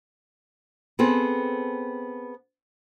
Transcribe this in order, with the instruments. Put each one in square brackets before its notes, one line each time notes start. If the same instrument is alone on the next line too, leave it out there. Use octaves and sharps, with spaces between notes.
[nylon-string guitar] B3 C4 G#4 A4